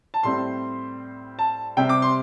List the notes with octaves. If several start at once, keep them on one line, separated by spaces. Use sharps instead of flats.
A5
A2 G3 C4 C6
A5
C3 G3 C4 G5
D6
C6